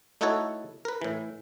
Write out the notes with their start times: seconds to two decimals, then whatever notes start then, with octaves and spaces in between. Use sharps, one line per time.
0.21 A3 D#4 E4 F#4 A4 C#5
0.85 A#4 B4
1.02 A2 E3